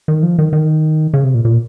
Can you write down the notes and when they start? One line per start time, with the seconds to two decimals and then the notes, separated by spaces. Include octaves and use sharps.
0.08 D#3
0.23 F3
0.39 D#3
0.53 D#3
1.14 C#3
1.24 C3
1.34 A#2
1.45 A#2